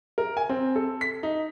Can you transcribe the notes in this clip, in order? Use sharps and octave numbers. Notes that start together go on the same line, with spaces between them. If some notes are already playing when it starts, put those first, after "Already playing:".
A#4
G#5
C4
A4
B6
D#4